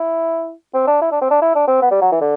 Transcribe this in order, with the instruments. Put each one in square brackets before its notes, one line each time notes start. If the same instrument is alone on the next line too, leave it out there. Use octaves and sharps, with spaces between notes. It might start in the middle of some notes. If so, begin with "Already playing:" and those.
Already playing: [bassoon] E4
C4
D4
E4
D4
C4
D4
E4
D4
C4
B3
G3
F#3
E3
D3